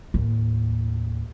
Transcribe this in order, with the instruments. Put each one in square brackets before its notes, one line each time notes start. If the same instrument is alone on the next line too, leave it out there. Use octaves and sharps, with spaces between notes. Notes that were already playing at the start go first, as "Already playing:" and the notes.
[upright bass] D#2 A2